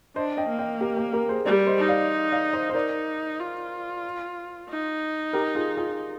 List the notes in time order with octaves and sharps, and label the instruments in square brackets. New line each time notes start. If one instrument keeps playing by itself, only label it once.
[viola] D4 [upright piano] C5 D#5
[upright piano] D#5 G5
[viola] A#3
[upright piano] D#5 G5
G4 A#4
G4 A#4
G4 A#4
G#4 C5
[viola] G3 [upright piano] A#4 D5
[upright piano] C5 D#5
[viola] D#4
[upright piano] D5 F5
D5 F5
C5 D#5
C5
[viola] D#4 [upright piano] A#4 D5
[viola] F4
D#4
[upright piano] G4 A#4
F4 G#4
F4 G#4